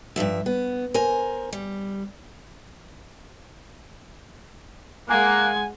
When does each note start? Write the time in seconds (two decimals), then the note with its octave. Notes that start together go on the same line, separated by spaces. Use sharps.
0.16 G2 C3 F3 E5
0.46 B3
0.94 A#4 C5 G#5
1.53 G3
5.09 G#3 A#3 F#5 G#5 F#6